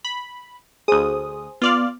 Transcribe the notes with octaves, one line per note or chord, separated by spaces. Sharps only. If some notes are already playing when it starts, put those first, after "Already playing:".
B5
D2 G#4 C5 D#6
B3 F4 D5 F5